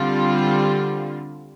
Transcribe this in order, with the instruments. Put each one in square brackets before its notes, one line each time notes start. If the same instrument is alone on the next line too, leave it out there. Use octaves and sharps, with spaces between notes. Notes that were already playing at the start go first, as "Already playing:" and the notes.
Already playing: [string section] D3 G3 C4 F4